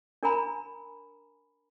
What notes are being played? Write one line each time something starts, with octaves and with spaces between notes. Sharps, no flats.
D4 A#4 G#5 A#5 B5